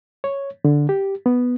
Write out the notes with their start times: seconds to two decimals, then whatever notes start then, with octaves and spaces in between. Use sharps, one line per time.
0.24 C#5
0.65 D3
0.89 G4
1.26 B3